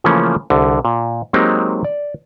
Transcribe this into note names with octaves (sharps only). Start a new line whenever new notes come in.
C#3 E3 F3 A3 A#3 C#4
C2 D3
A#2
F#3 G#3 A#3 C4 D#4 G4
D5